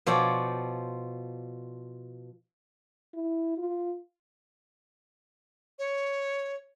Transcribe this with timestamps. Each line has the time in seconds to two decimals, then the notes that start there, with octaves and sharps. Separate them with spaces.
0.06 B2 F3 C#5 D5 G5
3.14 E4
3.58 F4
5.79 C#5